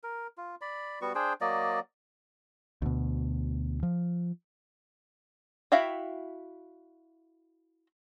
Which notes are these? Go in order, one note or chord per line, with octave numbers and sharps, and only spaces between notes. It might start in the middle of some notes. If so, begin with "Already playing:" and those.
A#4
F4
D5 B5
G3 B3 F#4 C#6
D4 G#4 C5 G5
F#3 A#3 D5 D#5
D2 B2
F3
E4 F#4 E5 F5 G5